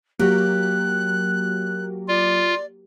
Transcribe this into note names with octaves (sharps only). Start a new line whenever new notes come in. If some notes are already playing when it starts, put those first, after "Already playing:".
F#3 A#3 G4 F#6
F4 D5